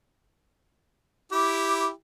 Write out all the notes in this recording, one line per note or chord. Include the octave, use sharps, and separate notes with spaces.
E4 G4 D6